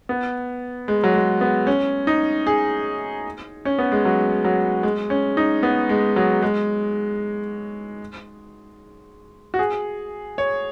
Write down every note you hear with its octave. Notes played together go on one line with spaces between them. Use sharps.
B3
G#3
F#3
G#3
B3
C#4
D#4
G#4
C#4
B3
G#3
F#3
F#3
G#3
C#4
D#4
B3
G#3
F#3
G#3
F#4
G#4
C#5